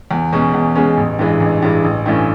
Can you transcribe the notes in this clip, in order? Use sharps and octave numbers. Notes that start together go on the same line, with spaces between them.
E2
B2 G#3 C#4
E2
B2 G#3 C#4
A1
G2 E3 G#3
A1
G2 E3 G#3
A1
G2 E3 A3 C#4